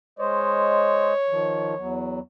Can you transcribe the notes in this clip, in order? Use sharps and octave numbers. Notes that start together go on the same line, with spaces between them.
G#3 C5 C#5 D#5
D#3 F3
E2 F#3